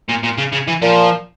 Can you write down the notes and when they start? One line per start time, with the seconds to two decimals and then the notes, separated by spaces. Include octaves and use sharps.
0.09 A#2
0.23 A#2
0.38 C#3
0.52 C#3
0.67 E3
0.82 A#2 F3